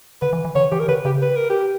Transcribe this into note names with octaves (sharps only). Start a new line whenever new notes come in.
D3 B4
E3
E3
D3 C#5
E3 G4
A#4
D3 B4
C#3 G4
B4
A#4
G4